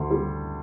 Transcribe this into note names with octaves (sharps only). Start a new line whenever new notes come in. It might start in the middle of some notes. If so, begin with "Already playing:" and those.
Already playing: D2
G3